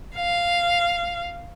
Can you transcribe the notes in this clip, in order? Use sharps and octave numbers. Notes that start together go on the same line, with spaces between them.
F5